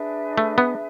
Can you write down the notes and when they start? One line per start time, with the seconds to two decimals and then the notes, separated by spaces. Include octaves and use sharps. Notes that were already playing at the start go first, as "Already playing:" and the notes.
Already playing: D4 G#4 B4 E5
0.38 A3
0.58 B3